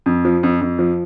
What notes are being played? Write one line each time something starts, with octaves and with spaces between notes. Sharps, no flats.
F2
F3
F2
F2
F3